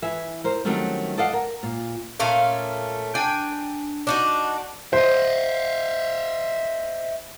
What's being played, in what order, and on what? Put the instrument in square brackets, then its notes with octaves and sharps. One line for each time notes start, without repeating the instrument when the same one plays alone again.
[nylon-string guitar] E3 E5 G#5
A#4 C5
D#3 F#3 G3 A3 C4 C#4
A4 D5 D#5 F5 F#5
A#4
A#2
[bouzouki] A#2 A3 C#4 F5
D4 G5 G#5
D4 D#4 F#4
[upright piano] C5 [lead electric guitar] D#5 E5